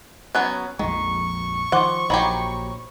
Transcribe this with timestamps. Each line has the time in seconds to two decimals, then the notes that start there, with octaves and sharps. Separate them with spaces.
0.35 F#3 B3 C#4 F#6
0.79 A#1 F2 D#3 G#3 C#6
1.72 D#3 F3 C5 F#5 C6 D6
2.10 A#1 D#3 F#3 G4 B5